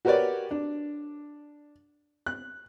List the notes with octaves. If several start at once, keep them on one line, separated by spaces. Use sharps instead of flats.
F#4 G4 A#4 B4 C#5 D5
D4
F#6